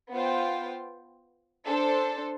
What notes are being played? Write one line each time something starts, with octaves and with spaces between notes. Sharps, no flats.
B3 F4 C5 G5
D4 A4 C5